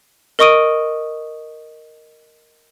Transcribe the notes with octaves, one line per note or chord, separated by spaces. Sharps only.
A#4 D#5 C#6 D#6 D7 D#7